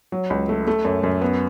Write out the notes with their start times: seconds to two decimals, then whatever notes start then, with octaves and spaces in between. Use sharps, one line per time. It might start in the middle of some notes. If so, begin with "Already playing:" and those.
0.12 F#3
0.30 C#2
0.49 A3
0.67 A3
0.85 F#2
1.03 F#2
1.21 B3